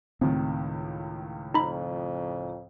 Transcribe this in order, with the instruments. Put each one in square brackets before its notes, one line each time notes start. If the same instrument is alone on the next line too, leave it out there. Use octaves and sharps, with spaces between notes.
[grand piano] C#2 A2 D#3 [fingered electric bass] C4
[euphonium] F2 [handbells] D#4 B5